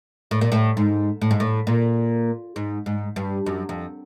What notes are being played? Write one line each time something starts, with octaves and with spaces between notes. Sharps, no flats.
A2
A#2
A2
G#2
A2
G#2
A2
A#2
G#2
G#2
G2
F#2
F2